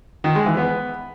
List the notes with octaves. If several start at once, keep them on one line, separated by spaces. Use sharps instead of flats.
D#3
G#3
E3
B3